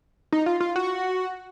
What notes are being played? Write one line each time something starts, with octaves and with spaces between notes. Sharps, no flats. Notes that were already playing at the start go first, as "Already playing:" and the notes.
D#4
F4
F4
F#4